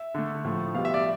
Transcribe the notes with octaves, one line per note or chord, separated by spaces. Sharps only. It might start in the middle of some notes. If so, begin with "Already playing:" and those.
Already playing: E5
D3 A3
A2 F3 A3
B2 G3 F5
E5
D5